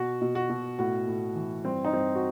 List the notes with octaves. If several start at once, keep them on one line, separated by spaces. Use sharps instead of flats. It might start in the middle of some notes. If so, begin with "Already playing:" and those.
Already playing: B2 F#4
B2
F#4
B2
A2 F#4
A2
E3
G2 C4
D#4
G2 C4
F#4